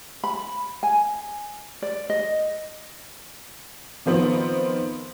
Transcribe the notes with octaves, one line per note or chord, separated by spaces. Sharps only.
B5
G#5
D5
D#5
D#3 F3 B3 C4